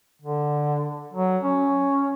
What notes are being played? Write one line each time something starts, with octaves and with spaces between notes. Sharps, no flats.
D3
F#3
C#4